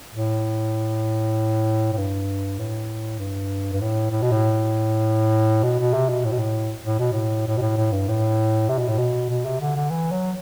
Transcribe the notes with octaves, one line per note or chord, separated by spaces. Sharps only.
A2
A2
G2
A2
G2
G2
A2
A2
B2
A2
B2
B2
C3
B2
A2
B2
A2
A2
B2
A2
A2
B2
A2
A2
G2
A2
C3
B2
A2
B2
B2
C3
D3
D3
E3
F#3